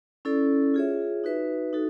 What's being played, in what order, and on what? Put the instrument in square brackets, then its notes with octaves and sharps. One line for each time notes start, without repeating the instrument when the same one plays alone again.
[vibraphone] C#4 E4 A4 D5
F4 G#4 C#5 E5
D#4 F#4 B4 E5
D#4 F#4 A4